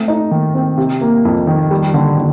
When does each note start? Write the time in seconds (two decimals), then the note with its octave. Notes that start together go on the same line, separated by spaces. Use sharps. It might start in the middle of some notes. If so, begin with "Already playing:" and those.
Already playing: A3 C4
0.08 D#4
0.31 D#3
0.54 C4
0.78 C3
1.01 A#3
1.25 F2
1.47 D#3
1.71 G3
1.94 D3
2.18 D3